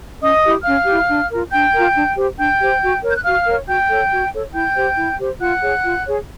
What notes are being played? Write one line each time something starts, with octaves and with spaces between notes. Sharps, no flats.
C#4 D#5 D#6
E4 G4
C#4 F5 F6
E4 G4
D4
F4 A#4
D4 G5 G6
F4 A#4
D4
G4 C5
D4 G5 G6
G4 C5
F#4
A#4 C#5
G6
F#6
F#4 F5 F6
A#4 C#5
F#4 G5 G6
A4 C#5
F#4
A4 C#5
E4 G5 G6
G4 C5
E4
G4 C5
F4 F#5 F#6
G#4 C#5
F4
G#4 C#5